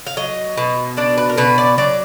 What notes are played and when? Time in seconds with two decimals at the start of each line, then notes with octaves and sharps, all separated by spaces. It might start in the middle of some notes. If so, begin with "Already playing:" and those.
0.07 F5
0.17 F#3 D#5
0.57 B2
0.97 D4 D5
1.18 B4
1.29 A#4
1.38 B2 B4
1.58 D5
1.78 F#3 D5